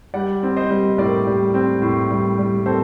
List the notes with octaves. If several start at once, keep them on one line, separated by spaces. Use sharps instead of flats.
G3 D5 F#5
C4
C5 D#5
G3
A2 A#4 D5
G3
C4
A2
G3
G3
C4 A4 C5